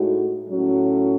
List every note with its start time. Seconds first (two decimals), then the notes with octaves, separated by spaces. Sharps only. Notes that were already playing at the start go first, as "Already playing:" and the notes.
Already playing: A2 G#3 D#4 F#4
0.49 A2 F#3 C#4 F#4